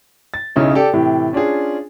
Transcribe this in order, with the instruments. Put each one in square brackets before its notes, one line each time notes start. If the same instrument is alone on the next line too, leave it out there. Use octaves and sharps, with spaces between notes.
[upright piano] A6
B1 C#3 D#4 E4 C#5
G4 A4 D5
A2 C3 E3 G4
C#4 D4 F4 G#4